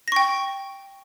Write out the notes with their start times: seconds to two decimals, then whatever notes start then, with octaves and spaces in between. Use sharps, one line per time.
0.08 A#6
0.12 C#6
0.16 G5